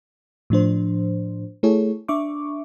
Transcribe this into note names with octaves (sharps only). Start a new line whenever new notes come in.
A2 F3 D4 C5
A3 E4 G#4 A4 C#5
D4 E5 C#6 D6